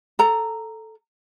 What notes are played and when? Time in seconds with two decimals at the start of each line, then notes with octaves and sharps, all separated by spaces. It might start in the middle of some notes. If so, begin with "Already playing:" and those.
0.19 A4 A#5